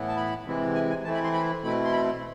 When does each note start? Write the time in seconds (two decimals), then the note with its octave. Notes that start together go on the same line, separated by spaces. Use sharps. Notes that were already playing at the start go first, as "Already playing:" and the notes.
Already playing: A2 E3 B3 E4
0.08 A5
0.16 B5
0.46 C3 E3 G#3 C4 E4
0.75 G#5
0.90 G#5
1.04 E3 A3 C4 E4 A5
1.14 B5
1.24 C6
1.33 B5
1.63 B2 A3 C4 E4 B5
1.85 C6
1.93 B5